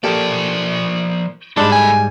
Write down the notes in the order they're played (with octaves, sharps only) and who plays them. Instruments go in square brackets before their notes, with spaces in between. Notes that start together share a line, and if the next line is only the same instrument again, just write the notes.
[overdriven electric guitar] F3 D5 [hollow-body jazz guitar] A#3 G4 A4
[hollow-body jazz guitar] G#2 G3 G#3 [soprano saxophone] D4 [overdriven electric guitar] A4 B5
[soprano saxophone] G#5